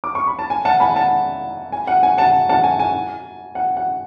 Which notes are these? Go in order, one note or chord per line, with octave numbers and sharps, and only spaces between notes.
D6
C#6
B5
A5
G#5
F#5 A5
G#5 B5
F#5 A5
G#5
F#5
G#5
F#5 A5
F#5 A5
G#5
G#5
F#5
F#5